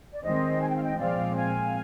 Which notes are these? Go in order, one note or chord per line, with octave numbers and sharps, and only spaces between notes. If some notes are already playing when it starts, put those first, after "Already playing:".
D5
D#3 G#3 C4 C5 D#5
G#5
G5
F5
D#5 G5
A#2 F3 G#3 C4 D5 F5
F5 G#5